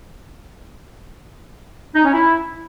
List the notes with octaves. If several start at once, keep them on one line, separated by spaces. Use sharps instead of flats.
D#4
C#4
E4